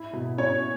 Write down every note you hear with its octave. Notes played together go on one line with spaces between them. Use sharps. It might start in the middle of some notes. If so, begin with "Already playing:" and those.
Already playing: E4
B2
C#4 C#5